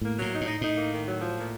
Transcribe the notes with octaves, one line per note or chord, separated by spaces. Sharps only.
A2 A#3
A2 F#3
D#4
A2
D#4
A2 D#4
A#3
D#3
F#3
F3
A#2